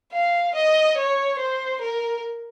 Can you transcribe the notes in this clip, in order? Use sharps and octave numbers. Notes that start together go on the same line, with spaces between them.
F5
D#5
C#5
C5
A#4